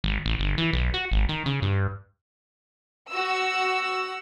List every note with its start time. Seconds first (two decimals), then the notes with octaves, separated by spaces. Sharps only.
0.04 G#1
0.26 A1
0.39 G1
0.58 E3
0.73 B1
0.94 F#4
1.12 G#1
1.29 D#3
1.46 C#3
1.62 G2
3.10 F#4 E6